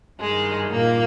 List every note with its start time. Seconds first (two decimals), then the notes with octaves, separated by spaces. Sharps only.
0.20 G2 D#3 G#3
0.70 A#2 A#3